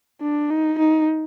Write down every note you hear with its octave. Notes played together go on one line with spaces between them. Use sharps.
D4
D#4
D#4